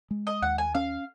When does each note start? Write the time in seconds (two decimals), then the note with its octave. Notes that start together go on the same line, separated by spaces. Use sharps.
0.11 G#3
0.27 D#5
0.42 D#2 F#5
0.58 G#5
0.75 C#4 F5